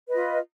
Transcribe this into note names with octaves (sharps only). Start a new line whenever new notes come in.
F4 B4 D#5